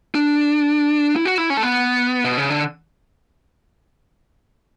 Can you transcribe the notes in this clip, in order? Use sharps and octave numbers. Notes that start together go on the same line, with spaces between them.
D4
E4
F#4
E4
C#4
A3
B3
B2
C#3
D3